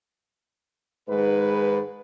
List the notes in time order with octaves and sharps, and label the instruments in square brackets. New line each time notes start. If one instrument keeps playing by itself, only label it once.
[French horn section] G#2 D#3 G#3 B4